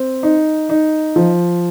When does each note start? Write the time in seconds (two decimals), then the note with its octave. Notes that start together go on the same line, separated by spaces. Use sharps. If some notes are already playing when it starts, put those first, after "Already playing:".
Already playing: C4
0.23 D#4
0.70 D#4
1.16 F3